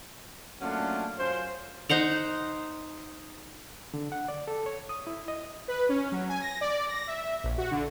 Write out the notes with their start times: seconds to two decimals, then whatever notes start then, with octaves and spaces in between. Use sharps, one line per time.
0.61 F#3 A3 A#3 C#4 D4 F4
1.19 F#2 C#4 F4 C5
1.89 D#4 C5 F#5 A#5
3.94 D3
4.12 F#5
4.28 D5
4.48 A4
4.66 C#5
4.89 D#6
5.07 E4
5.28 D#5
5.68 B4
5.89 C#4
6.12 F#3
6.29 G#5
6.41 A#6
6.61 D5
6.89 A#6
7.07 E5
7.44 A#1
7.58 F#4
7.71 D3